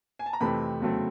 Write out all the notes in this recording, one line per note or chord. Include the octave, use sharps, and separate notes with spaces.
G#5
A5
A#5
F2 C3 E3 A3 C4 B5
E2 C#3 F#3 A3 C4